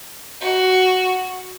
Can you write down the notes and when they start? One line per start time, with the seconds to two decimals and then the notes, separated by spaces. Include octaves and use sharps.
0.41 F#4